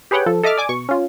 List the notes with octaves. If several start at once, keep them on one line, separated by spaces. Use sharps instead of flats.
G4 G#4 B4 C#5 F#5 G5
F3 A4
A4 D#5 E5 D6 F6
D5 G#5 D6
B2 C#6
C#4 F4